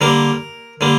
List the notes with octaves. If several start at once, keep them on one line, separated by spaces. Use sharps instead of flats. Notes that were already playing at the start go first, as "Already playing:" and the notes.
D3 G3 A#3 A#4
D3 G3 A#3